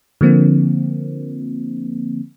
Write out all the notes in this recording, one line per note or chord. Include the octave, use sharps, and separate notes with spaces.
D3 F3 A#3 C4